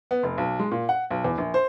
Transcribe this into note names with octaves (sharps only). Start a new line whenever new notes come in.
B3
F1
B1
G#3
A#2
F#5
B1
E2
A#1
C5